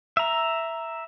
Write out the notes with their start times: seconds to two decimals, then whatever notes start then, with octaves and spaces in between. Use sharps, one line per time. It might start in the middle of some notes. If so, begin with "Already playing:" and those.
0.17 E5 A#5